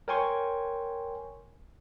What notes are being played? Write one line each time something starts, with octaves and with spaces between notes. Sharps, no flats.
A#4 C#5 G5 G#5 C6 C#6